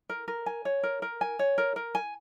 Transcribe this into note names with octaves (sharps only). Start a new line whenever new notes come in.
A#4
A#4
G#5
C#5
A#4
A#4
G#5
C#5
A#4
A#4
G#5